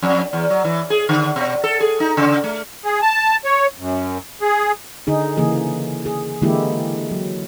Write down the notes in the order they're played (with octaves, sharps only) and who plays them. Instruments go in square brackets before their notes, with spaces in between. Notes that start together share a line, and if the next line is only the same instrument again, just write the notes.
[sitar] F2
E2
F#3
E3
G#4
D3
B2
A4
G#4
D#4
C#3
A3
[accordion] G#4
A5
C#5
F#2
G#4
[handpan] D3 D#4 G#4
C#3 E3 A#3 G#4
G#4
D3 E3 G#3 A#3 E4 G4
F#3